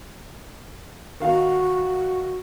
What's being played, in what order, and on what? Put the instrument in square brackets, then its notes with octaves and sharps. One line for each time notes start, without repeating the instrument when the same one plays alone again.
[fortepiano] D#3 F5 [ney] F#4